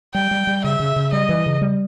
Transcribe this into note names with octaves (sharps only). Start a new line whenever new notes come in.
G3 G5
G3
G3
C#3 E5
C#3
C#3
G3 D#5
E3
C#3
G3